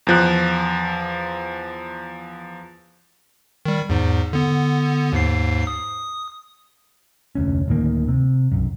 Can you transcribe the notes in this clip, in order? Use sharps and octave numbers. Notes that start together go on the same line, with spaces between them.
E2 F3 F#6
D#3 G3
E2 G#2
D3 B3
D#2 G#2 C7
D#6
F1 D2 C#4
D1 A2 D#3 A#3
C3
B1 F#2